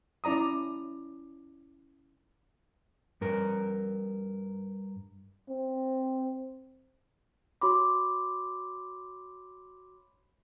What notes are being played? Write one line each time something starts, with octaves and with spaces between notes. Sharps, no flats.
C#4 E4 D5 A#5 D#6
G2 A#4
C4
F#4 C#5 B5 C6 D6